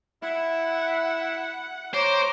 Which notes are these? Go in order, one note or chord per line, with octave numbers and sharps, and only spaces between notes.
E4 F#5
C5 C#5 A#5 D6